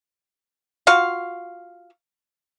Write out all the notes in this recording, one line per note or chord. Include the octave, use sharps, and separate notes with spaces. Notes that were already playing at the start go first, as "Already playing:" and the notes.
F4 F#4 F5